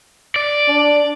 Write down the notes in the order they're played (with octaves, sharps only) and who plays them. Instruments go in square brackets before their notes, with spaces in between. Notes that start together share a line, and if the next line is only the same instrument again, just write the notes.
[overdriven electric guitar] D5
[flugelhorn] D4